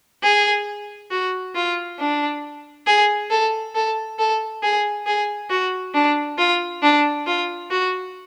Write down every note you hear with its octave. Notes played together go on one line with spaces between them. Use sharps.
G#4
F#4
F4
D4
G#4
A4
A4
A4
G#4
G#4
F#4
D4
F4
D4
F4
F#4